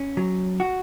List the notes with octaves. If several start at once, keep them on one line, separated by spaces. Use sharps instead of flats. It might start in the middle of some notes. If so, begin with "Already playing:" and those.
Already playing: C#4
F#3
F#4